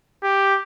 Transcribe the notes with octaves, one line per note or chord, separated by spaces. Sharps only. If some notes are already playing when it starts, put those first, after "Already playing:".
G4